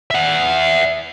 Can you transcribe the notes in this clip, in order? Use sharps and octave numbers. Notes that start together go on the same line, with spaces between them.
E5 F#5